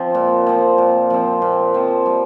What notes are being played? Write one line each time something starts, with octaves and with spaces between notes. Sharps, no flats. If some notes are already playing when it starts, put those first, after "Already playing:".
Already playing: F3 C4
A#2
F3 C4
A#2
F3 C4
A#2
F3 C4
G3